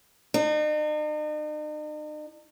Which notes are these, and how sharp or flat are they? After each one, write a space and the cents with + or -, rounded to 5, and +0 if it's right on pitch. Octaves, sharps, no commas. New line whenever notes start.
D#4 -45